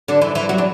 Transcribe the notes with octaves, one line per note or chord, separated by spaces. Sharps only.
D3 D4
E3 E4
E3 E4
F#3 F#4
D4